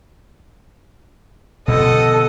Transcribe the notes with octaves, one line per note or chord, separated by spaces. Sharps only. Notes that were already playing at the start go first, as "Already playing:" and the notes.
B2 D3 F3 A4 D#5 F#5